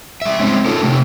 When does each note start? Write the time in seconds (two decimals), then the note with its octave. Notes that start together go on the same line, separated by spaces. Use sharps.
0.22 G3 E5
0.39 G#3 C4 C#4 D#4
0.65 D#4 F4 A4 A#4
0.82 C3 A3